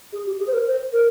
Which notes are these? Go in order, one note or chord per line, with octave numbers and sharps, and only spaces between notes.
G#4
G4
G#4
C5
A#4
C5
A#4